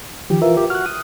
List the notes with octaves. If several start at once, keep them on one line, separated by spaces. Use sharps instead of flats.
D#3 F3 G4
E3 F4 A#4 E5
G4
F#4 F6 F#6
D#6